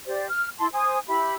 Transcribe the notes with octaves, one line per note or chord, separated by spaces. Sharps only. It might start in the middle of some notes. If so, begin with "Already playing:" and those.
G4 C5 D5
F6
E4 A5 C6
C5 G#5 D#6
E4 G4 E5 B5